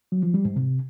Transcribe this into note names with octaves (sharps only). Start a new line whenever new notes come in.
F#3
F3
G3
G#2
C3